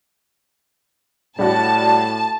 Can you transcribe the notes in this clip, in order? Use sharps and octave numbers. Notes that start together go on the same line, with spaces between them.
A2 G3 F#4 A5